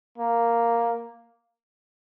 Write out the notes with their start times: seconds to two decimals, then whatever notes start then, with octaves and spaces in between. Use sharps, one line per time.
0.18 A#3